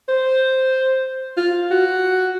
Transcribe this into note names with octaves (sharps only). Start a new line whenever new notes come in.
C5
F4
F#4